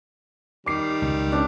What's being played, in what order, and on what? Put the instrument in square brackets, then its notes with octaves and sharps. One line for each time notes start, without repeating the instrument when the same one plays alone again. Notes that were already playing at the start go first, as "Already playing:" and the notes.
[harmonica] D#3 G3 [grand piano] D6 C7
[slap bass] C#2
[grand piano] C#4 [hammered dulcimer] D4